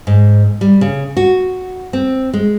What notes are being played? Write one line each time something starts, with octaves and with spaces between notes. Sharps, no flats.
G#2
G3
C#3
F#4
C4
G#3